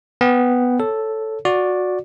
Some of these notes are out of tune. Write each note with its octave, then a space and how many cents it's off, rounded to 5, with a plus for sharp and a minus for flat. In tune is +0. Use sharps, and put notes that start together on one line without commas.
B3 +5 G5 +15
A4 +0 C#5 +0
F#4 -20 D5 +0